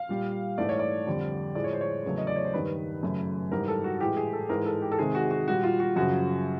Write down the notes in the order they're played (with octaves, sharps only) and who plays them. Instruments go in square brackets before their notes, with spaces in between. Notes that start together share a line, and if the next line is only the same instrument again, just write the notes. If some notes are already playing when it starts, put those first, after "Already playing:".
Already playing: [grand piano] F5
A#2 G3
G#2 E3 A3 D5
C#5
D5
F2 D3 G3
A2 F3 G#3 D5
C#5
C5
C#5
E2 C#3 F#3 A3
D#5
D5
C#5
C5
G2 D#3 G3 B4
F#2 C#3 F#3 A3
G#2 E3 G3 A#4
A4
F#4
A2 E3 G#3 G4
G#4
A4
G#2 E3 G#3 A#4
A4
G4
A4
C3 D#3 G#3 G#4
F#4
F#4
A#2 G3 F#4
F4
F#4
F#2 C#3 F3 F#4